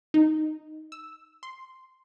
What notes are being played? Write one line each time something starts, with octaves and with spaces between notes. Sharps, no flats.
D#4
E6
C6